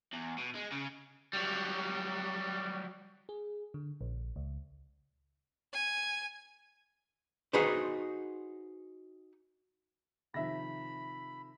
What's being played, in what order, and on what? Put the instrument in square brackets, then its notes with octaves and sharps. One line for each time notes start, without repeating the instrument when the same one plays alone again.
[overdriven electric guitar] E2
B2
G#3
C#3
F#3 G3
[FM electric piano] G#4
D3
A#1
C#2
[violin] G#5
[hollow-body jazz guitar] D#4 F#4 G#4 B4 C5
[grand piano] C3 D#3 F3 [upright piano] E5 A#6 [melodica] B5